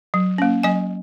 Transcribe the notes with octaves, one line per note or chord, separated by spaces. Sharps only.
F#3
A#3 C#4
F#3 D#5 G#5